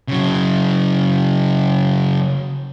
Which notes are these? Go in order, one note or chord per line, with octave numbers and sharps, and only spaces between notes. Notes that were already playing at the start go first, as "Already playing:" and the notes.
C#3 F#3